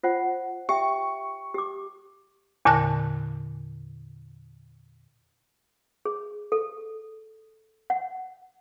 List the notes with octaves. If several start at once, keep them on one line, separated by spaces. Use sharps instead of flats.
F4 C5 F#5
G4 E5 G5 C#6
G4 D6
E2 A#2 D3 A5 F#6 A#6
G#4
A4
F#5